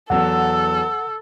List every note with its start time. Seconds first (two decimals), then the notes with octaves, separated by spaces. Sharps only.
0.10 E2 F#3 B3 A4 F#5 E6